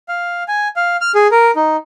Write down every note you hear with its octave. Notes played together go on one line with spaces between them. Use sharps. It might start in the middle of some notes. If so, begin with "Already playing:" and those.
F5
G#5
F5
F6
G#4
A#4
D#4